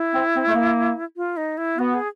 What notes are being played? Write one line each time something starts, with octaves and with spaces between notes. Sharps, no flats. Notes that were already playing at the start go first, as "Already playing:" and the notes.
Already playing: E4
C4
C4
A3
A#3
F4
D#4
E4
B3 F#4
G#4